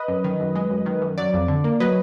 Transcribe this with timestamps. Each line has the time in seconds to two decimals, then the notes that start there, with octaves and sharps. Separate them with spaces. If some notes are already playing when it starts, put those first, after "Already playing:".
Already playing: B4 D#5
0.08 F#2
0.24 D#3
0.40 F#2
0.55 G#3
0.70 F#2
0.86 D#3
1.02 F#2
1.18 F#3 D5
1.34 F2
1.48 D3
1.64 A#3
1.80 F#3 B4 D#5